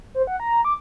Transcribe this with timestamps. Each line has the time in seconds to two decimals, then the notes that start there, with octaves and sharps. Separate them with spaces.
0.15 C5
0.27 F#5
0.40 A#5
0.65 D6